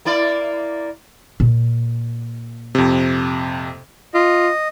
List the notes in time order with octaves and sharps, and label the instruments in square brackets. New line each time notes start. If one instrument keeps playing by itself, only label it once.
[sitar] A#3 E4 D5
[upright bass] A#2
[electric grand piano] F2 C3
[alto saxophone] F4 [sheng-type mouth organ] D#5